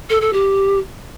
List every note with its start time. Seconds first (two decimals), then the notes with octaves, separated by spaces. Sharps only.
0.09 A4
0.21 A4
0.32 G4